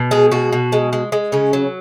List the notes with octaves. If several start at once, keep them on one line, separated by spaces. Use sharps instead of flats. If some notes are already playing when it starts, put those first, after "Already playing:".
Already playing: B2
G#3 G#4
B2 F#4
B2
G#3
G#3
G#3
C#3 C#4
F#3